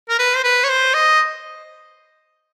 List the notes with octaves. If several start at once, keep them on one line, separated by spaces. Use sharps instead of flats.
A#4
B4
C5
B4
C#5
C5
D#5